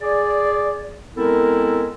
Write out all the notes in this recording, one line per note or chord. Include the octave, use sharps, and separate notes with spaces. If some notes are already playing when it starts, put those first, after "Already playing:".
G#4 D5
G#3 B3 C4 E4 A4 A#4